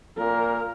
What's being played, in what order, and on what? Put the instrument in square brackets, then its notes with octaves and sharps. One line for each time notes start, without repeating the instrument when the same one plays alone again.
[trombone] A#2 [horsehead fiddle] A#4